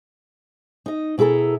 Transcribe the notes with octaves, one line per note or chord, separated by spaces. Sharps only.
D#4 D#5
B2 E4 G#4 A4 A#5